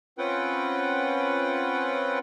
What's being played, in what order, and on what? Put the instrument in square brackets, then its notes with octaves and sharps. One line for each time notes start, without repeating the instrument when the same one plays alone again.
[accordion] C4 C#4 F4 B4 F#5 G5